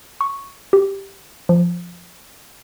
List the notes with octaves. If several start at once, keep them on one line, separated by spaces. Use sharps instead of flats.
C#6
G4
F3